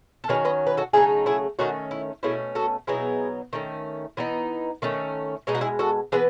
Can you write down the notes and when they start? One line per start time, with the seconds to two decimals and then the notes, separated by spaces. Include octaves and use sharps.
0.24 A4
0.29 D#3 F#3 C#4 G#4 B4
0.45 B4 D#5
0.67 B4
0.77 F#4 A4
0.93 C#3 F#3 A3 D#4 E4 G#4
1.26 E4 G#4
1.59 D#3 A3 C#4 D#4 F#4
1.91 E4
2.23 B2 A3 C#4 E4 G#4
2.55 F#4 A4
2.87 B2 F#3 B3 D#4 E4 G#4
3.53 D#3 A3 C#4
4.17 E3 B3 D#4
4.82 D#3 A3 C#4
5.47 B2 G#3 D#4 G#4
5.55 F#4
5.61 E4 G#4
5.79 F#4 A4
6.12 E3 B3 G#4 B4